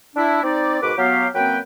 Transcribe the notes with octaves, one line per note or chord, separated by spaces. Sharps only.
D4 E4
C4 D#4 D5
G#2 B2 F#4 A#4 B4 D6
F#3 B3 G4 F5
F#2 F#3 A#3 C4 B4 G5